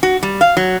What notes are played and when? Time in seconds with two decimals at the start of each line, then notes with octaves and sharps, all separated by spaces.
0.03 F#4
0.23 G3
0.41 F5
0.57 F#3